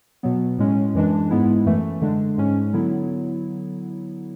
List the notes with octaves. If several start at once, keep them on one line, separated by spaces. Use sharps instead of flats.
B2 F#3 B3
A2 G#3 C#4
F#2 E3 G#3 D4
G#2 G#3 B3 E4
F#2 E3 A3
D3 G#3 D4
G#2 G#3 C#4
D3 F#3 B3 E4